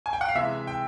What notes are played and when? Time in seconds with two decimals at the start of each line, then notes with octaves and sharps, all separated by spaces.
0.06 G#5
0.13 G5
0.21 F#5
0.29 F5
0.35 C3 E3 G#3 E5
0.67 G5